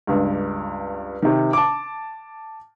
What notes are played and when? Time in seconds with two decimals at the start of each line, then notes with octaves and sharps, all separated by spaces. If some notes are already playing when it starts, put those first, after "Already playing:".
0.07 C#2 G2
1.22 C3 D#3
1.53 A5 D6